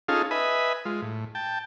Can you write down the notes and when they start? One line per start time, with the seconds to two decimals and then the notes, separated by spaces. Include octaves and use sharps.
0.08 C#4 D#4 F4 G#4 A4 F5
0.31 B4 D#5 E5 G#5 B5
0.85 G#3 F4
1.02 A2
1.35 G5 A5